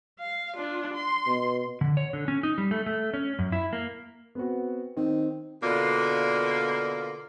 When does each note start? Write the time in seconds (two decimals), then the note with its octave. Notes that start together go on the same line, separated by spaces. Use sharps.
0.19 F5
0.56 D4 F4
0.94 C6
1.27 B2
1.81 D3
1.97 C#5
2.13 D3
2.28 C#4
2.43 D#4
2.58 G3
2.71 A3
2.86 A3
3.14 C#4
3.39 F#2
3.52 E4
3.73 A#3
4.35 B3 C4 F#4
4.97 D#3 C4
5.61 B2 D3 A#3 F4 D5